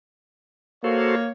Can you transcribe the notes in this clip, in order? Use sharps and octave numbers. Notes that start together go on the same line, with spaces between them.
A#3 F#4 A4 C5 C#5